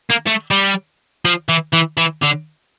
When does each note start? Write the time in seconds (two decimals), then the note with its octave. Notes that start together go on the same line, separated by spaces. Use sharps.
0.10 A#3
0.27 A3
0.51 G3
1.25 F3
1.49 E3
1.73 E3
1.97 E3
2.22 D3